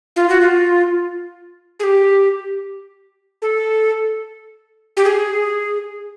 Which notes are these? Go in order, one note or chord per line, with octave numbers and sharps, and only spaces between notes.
F4
F#4
F4
G#4
G4
A4
G4
G#4